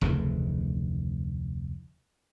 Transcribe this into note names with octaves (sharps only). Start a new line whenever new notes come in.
F1 D2 C#3 E3